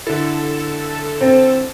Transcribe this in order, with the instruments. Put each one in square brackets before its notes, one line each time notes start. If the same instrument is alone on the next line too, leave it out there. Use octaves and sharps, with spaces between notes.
[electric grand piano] D3 E4 [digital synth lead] A4
[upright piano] C4